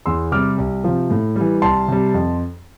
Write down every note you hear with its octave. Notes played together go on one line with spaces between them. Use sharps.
E2 C6 E6
C3 G3 D6 F6
C2
C3 F3
A2
E3 G3
C2 A5 C6
C3 G3
F2